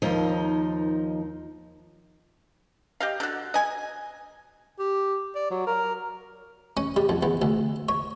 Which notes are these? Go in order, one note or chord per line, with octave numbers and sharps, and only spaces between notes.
D#2 F3 D#4
G4 D#5 F5
D3 F#4
D#5 G#5
G4
D5
F#3
A#4
C#4
G3
F2
E2
D2
C#5